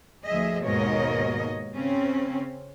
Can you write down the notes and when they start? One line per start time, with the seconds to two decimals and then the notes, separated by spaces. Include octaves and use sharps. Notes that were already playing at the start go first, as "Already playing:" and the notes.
0.23 D2 F3 G#4 D#5 E5
0.63 D#2 G#2 B2 A#4 C#5 D#5
1.73 C#3 C4 C#4